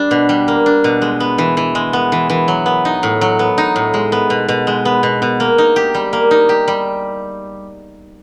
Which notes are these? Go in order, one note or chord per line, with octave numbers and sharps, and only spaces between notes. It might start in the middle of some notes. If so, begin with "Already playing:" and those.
Already playing: G3 D4
B2
G3
A#3
D4
B2
G#3
B3
E3
E3
G#3
B3
E3
E3
F#3
B3
D#4
A2
F#3
B3
D#4
A2
G#3
B3
B2
B2
G#3
B3
B2
B2
A#3
D#4
G4
G3
A#3
D#4
G4
G3